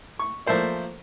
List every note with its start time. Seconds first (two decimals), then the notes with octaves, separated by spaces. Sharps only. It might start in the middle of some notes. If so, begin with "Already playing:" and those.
0.19 C#6
0.46 F3 A3 A#3 C5 D5